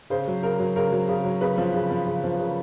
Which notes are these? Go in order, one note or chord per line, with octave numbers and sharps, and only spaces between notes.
C#3 C5
F#3
C#3 A#4
F#3
C#3 A#4
F#3
C#3
F#3
C#3 B4
F3
C#3
F3
C#3
F3
C#3